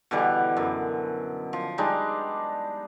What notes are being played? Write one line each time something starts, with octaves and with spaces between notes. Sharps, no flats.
B2 D3 E3 G3
F#2
F3
G3 G#3 D4 D#4